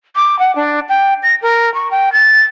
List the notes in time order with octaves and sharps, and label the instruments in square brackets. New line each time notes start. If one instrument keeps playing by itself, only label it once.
[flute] D6
F#5
D4
G5
A#6
A#4
C#6
G5
A6